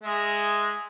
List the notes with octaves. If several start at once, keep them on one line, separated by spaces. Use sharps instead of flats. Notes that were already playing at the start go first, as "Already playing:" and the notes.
G#3 E5